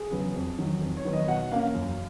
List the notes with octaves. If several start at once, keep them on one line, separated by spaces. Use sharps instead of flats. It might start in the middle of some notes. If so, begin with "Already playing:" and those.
Already playing: G#4
C#3 F#3 B3
F2
D#3 F#3
F2
C#5
D#3 F#3 B3
D#5
B2 F#5
A#3 C#4 F5
F#2